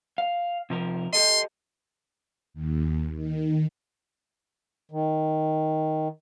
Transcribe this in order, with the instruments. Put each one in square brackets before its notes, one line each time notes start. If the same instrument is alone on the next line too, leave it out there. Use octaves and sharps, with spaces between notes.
[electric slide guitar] F5
C3 F3 A#4
[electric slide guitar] G4 A4 D#5 [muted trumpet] C6
[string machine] D#2
D#3
[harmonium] D#3